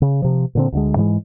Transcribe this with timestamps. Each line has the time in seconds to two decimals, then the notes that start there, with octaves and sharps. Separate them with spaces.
0.02 C#3
0.22 C3 F3
0.55 A#2 D3 C4
0.72 D2 D3 G#3
0.96 G#2 E3 G3 G#3